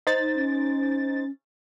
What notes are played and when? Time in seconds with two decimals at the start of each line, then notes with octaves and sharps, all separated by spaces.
0.07 D#4 C5 A6
0.35 C#4